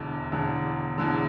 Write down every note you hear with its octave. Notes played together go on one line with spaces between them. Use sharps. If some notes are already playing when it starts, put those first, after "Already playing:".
Already playing: E1 E2 D3
E1 E2 D3
E1 E2 D3